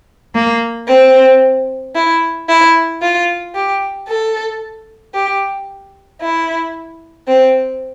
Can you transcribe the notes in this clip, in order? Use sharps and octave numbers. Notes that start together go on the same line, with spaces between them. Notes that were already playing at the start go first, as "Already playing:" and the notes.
A#3
C4
E4
E4
F4
G4
A4
G4
E4
C4